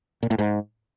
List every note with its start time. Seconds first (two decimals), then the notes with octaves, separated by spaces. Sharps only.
0.23 A#2
0.31 A2
0.39 G#2